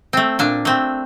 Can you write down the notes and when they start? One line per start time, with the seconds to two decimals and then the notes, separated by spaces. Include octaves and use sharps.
0.13 A3 C4
0.39 A#2 D4
0.65 A3 C4